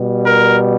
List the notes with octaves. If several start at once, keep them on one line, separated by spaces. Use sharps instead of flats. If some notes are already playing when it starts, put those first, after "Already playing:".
Already playing: B2 G3
A#4